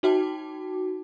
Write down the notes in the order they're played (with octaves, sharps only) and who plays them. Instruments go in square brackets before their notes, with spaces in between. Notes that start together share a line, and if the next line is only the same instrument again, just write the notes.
[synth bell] D#4 F#4 G5 A5 D6